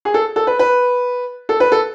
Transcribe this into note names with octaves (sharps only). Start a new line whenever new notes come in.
G#4
A4
A4
B4
B4
A4
B4
A4